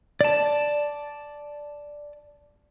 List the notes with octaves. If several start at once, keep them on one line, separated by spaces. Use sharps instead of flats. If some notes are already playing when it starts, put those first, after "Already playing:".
D5 A5